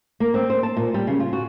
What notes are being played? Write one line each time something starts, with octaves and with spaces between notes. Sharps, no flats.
A#3
C4
C5
A5
A#2
G3
C#3
F4
F#4